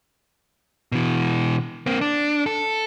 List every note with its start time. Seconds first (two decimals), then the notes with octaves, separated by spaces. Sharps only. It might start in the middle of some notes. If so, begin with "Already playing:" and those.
0.92 B2 E3
1.86 A#3 C4
2.01 D4
2.46 A4